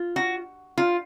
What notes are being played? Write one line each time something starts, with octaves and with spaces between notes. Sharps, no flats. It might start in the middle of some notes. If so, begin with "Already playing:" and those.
Already playing: F4
F#4
F4